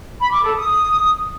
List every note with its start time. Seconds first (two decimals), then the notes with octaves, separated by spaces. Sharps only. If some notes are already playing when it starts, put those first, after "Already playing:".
0.20 B5
0.32 D6
0.44 A4
0.56 D#6